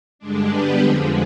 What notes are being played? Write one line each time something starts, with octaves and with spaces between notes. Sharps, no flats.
G2 D3 G#3 D4
G3 B3 D4 G4 B4
F2 D3 F3 G#3